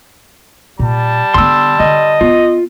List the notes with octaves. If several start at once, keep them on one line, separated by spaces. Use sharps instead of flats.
A#2 G3 A5
D3 B3 C6 E6
D3 D#5
B3 F4